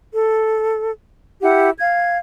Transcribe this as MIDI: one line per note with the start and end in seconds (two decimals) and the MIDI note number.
0.12 0.91 69
1.41 1.69 64
1.41 1.69 67
1.41 1.69 78
1.79 2.17 77
1.79 2.17 92